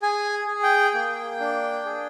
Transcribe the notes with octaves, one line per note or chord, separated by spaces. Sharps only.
G#4 G#5
G#4
G5
A#3
D4
G#4